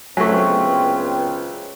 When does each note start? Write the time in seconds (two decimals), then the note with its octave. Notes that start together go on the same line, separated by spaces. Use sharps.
0.17 C#2 F#3 A3 B3 C4 G#5 C#6